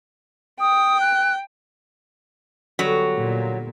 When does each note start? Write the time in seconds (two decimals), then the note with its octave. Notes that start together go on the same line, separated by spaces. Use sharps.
0.60 G5 D#6
1.00 F#6
2.79 D3 F#3 G3 B3
3.16 A#2